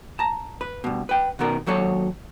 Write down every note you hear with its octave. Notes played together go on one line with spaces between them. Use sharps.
A5 A#5
B4
G2 B2
B4 G5
B2 D#3 B3 A#4
D#2 F#3 A4 C#5